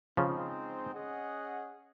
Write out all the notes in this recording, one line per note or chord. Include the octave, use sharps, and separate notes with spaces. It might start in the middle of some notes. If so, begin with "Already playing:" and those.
C#3 F3 G#3 C4 D#4 G#4 C5
C#4 G#4 D#5 F#5